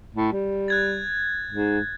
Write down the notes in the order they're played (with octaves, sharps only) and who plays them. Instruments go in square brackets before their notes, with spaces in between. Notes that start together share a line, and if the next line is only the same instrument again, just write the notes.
[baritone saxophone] A2
G3
[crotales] F#6 G#6 A6
[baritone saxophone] G#2